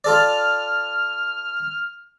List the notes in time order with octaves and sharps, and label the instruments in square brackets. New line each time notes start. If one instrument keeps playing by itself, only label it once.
[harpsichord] F4 A4 D5 [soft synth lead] F6